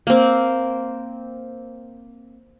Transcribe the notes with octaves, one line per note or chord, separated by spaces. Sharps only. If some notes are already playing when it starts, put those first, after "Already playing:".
A#3 C4